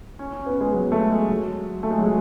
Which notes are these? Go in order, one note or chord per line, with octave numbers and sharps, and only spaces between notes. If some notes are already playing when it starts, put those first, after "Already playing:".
C#4
C#4
B3
G#3
F#3
A3
G#3
F#3
A3
G#3
F#3
G#3